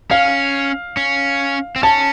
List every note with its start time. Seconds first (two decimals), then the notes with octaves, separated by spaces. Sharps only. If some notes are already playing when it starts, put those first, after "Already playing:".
0.11 C#4 F5
0.97 C#4
1.76 C4
1.83 C#4 A5